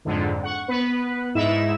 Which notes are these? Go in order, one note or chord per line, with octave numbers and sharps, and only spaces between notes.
F2 G#2 D3
F#5 C#6
B3 B4
G#2 D#4 E4 E5 E7